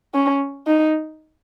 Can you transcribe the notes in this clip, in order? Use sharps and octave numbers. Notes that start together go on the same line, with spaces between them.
C#4
D#4